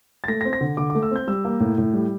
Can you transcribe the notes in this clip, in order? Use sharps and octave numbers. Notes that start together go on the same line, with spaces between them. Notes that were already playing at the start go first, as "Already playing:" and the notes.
A6
A3 A#6
A#6
C4
A#6
D3
D3 D6
D6
A3
E6
C4 G6
G3 E6
A#3
A2
A2
G3